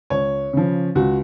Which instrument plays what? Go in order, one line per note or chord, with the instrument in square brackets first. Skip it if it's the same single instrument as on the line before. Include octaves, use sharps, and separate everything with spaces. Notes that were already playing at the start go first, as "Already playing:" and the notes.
[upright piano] C#2 C#5
C#3 F3
C#2 F#4